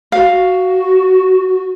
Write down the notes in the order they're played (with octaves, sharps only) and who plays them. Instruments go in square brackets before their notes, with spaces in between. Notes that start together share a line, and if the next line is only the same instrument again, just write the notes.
[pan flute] F#4 [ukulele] F5